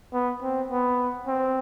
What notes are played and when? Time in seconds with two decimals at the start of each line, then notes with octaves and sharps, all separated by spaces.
0.13 B3
0.42 C4
0.71 B3
1.27 C4